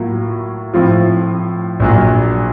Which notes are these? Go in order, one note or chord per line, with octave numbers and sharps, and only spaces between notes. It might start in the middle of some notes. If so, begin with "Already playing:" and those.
Already playing: A2 F#3 A#3 F4
A2 F3 C4 F4
A#1 A#2 F#3